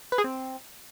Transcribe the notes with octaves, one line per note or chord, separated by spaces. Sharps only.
B4
G#4
C4